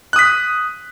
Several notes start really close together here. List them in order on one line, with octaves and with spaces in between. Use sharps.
F#6 D#6 B6